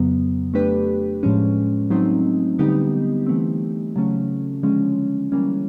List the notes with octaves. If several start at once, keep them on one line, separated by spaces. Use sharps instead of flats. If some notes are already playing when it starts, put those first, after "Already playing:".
Already playing: F2 C#3 F#3 B3
A3 D4 G4 B4
A2 F3 G#3 C#4
F#3 A3 C4 D#4
D3 G3 B3 D#4 G4
E3 A3 C4
C#3 F#3 A3 C#4
D3 F3 G#3 C#4
E3 G3 A#3 C#4